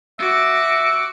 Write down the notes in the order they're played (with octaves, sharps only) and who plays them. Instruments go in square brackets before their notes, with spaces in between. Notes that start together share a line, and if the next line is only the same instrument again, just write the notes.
[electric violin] F#4 D6 [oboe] E5